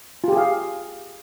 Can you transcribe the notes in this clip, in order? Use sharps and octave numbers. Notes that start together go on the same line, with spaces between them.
F4 G4 G#4 F5